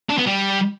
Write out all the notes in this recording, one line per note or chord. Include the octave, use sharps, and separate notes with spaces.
D4
B3
G3